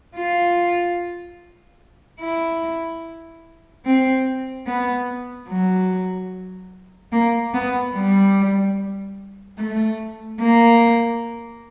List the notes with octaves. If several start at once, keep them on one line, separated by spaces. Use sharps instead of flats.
F4
E4
C4
B3
F#3
A#3
B3
G3
A3
A#3